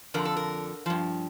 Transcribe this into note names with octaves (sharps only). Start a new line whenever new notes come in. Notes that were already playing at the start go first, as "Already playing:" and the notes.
F2 D3 F3 A#4
A4
A#4
G2 F3